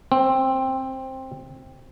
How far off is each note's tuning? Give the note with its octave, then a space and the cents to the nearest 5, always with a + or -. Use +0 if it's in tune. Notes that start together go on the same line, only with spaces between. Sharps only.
C4 +10